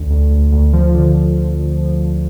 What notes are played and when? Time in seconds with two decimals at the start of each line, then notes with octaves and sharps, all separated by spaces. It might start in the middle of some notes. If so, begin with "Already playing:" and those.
Already playing: D2
0.10 D2
0.30 D2
0.52 D2
0.73 F3
0.94 D3